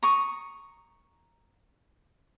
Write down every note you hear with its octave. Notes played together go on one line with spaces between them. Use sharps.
A#5 C#6 D#6